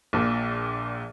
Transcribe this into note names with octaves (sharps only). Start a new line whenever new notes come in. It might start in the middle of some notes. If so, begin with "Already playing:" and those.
A#1 A#2